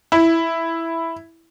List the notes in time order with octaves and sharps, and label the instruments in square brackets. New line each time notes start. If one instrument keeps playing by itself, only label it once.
[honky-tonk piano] E4